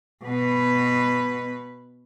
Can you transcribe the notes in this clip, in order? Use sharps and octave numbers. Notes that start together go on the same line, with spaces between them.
B2 B4